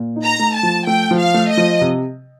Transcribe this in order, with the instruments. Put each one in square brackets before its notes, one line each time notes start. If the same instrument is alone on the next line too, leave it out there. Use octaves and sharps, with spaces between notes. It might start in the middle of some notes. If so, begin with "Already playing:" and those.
Already playing: [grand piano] A#2
D#4
[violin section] A#5
[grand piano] A3
[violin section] A5
[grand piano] F3
[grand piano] A3 [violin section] G5
[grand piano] F3
[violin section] F5
[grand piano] A3
[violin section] D#5
[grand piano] F3
C3